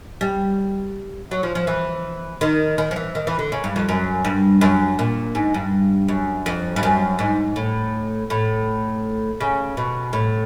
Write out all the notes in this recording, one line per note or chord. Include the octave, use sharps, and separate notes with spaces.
G3
F#3
F3
F3
E3
D#3
D#3
F3
E3
D#3
E3
D3
C#3
G2
F2
F#2
G2
F#2
A#2
G#2
G2
F#2
F2
G2
F#2
G#2
A2
A2
C#3
B2
A2